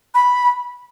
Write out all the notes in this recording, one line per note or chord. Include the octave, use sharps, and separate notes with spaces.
B5